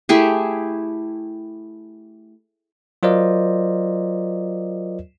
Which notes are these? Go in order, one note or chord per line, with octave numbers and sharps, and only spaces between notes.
A3 E4 G4 G#4
F#3 F4 A#4 C5 D5 D#5